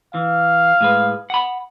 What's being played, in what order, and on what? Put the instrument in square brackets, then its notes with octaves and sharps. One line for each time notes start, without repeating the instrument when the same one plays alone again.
[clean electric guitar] E3 [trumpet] F5
[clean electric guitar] A2 G#3 B4
F#5 B5